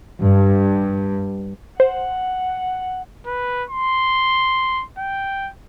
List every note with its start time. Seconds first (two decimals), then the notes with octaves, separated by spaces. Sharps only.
0.21 G2
1.80 C5 F#5
3.26 B4
3.70 C6
4.98 G5